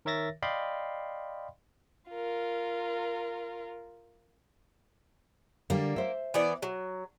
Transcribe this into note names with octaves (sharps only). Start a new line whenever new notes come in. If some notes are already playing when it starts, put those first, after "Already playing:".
D#3 A#4 C#5 E5 A6 A#6
D5 D#5 F5 G5 B5 C6
F4 A#4
D3 G3 A#3
C5 E5
E3 B3 D5
F#3